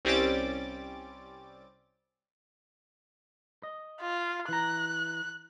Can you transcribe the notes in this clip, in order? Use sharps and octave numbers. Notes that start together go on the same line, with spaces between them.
C2 G3 C4 C#4 D6 A6
D#5
F4
E3 A#5 F#6